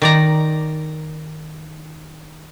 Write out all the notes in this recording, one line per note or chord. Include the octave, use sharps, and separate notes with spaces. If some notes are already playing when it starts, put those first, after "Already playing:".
D#3 D5 A#5